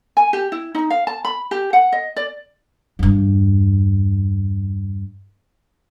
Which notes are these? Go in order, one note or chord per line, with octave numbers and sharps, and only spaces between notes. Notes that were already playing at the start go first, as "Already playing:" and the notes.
G#5
G4
E4
D#4
F5
A5
B5
G4
F#5
D#5
D5
E2 G2